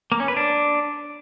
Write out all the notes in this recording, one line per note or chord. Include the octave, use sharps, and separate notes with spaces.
A#3
C#4
B4
D4